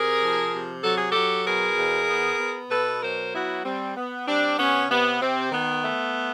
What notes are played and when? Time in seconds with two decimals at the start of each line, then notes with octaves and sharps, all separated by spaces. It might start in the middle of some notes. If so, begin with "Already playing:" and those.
Already playing: C3 G#4 A#4
0.22 F3
0.53 C3
0.83 F#3 A4
0.97 G#4
1.11 F#3 G4 A4
1.46 B2 G#4 A#4
1.78 E2
2.09 B3
2.40 B3
2.71 B2 A4 B4
3.02 F#3 A#4 C5
3.34 B3 E4 F#4
3.64 G3 C4
3.97 B3
4.27 G3 C4 D4
4.58 C3 B3 C#4
4.90 C3 B3
5.21 C3 C4
5.52 D#3 B3
5.84 A3